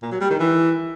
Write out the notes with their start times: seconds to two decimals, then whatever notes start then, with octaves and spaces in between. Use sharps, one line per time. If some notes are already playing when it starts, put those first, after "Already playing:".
0.02 A#2
0.12 F#3
0.21 G3
0.30 D#3
0.40 E3